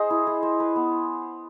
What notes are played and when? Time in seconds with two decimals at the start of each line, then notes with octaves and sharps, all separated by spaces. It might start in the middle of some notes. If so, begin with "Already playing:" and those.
Already playing: G#4 C5 D#5
0.10 E4
0.27 G#4
0.43 C5
0.60 B4
0.76 B3